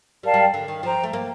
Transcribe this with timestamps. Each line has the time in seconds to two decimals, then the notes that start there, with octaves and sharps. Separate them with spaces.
0.23 G3 A#4 D5 F5 A5
0.34 G3
0.54 D3
0.68 D#3
0.83 F3 C5 G5 A#5
1.03 A3
1.13 A#3